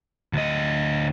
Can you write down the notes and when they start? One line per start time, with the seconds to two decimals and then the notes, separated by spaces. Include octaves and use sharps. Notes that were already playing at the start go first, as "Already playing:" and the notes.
0.33 D2 D#5